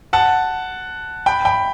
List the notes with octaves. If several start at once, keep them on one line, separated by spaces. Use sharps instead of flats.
F#5 A5
G5 B5
G5 B5